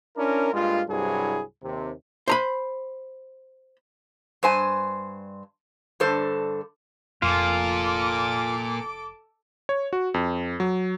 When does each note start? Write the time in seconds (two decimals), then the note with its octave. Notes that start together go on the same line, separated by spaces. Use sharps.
0.17 C#4 D4 E4 A#4
0.53 G2 G#3 A#3 F4
0.89 C2 G2 C3 F#3 E4 G#4
1.63 D#2 C3
2.28 C5 A#5 B5
4.43 G2 C5 G#5
6.00 G2 D3 A4 C5
7.22 F1 F2 A#2 F4 A4 D6
9.69 C#5
9.93 F#4
10.14 F2
10.60 F#3